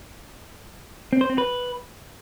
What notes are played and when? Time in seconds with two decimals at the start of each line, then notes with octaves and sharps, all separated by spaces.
1.13 C4
1.21 C5
1.30 C4
1.38 B4